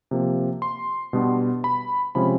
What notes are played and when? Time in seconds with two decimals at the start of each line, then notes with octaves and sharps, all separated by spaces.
0.11 C3 F3 A#3
0.62 C6
1.13 B2 G3 B3 D4
1.64 B5
2.15 C3 F3 G#3 C#4 B5